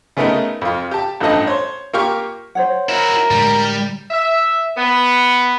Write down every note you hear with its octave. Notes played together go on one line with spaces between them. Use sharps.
C#3 A3 B3 D#4 A#4
F2 F4
G4 A5
A1 G2 F3 A4 D#5 A5
C5 C#5
A#3 F4 G4 C#6 F6
C5 C#5 F#5
E4 F#4 A#4
A2 D3 G3 G#3
E5
B3